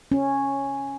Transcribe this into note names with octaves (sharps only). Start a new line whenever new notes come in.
C#4